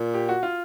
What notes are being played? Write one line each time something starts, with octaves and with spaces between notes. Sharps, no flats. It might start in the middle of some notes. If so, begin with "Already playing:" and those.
Already playing: A#2
G4
F#4
F4